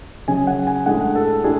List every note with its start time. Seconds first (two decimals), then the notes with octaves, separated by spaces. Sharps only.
0.28 C#3 F#3 C#4 G#5
0.47 F#5
0.67 G#5
0.86 A2 G#3 D4 F#5
1.15 A4
1.44 A2 D4 G#4